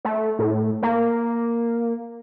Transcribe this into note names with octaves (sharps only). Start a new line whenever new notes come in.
A3
A2
A#3